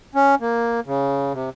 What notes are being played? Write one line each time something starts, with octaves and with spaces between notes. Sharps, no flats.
C#4
A#3
C#3
C3